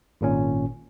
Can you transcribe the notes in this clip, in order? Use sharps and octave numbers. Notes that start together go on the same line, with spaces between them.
G#1 A#2 C#4